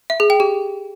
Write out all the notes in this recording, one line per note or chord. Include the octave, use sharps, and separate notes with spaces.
E5
G#4
G5
G4